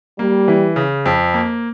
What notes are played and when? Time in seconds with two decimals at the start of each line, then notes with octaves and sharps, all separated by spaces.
0.19 G3 A#3
0.48 E3
0.76 C#3
1.06 F2
1.34 A#3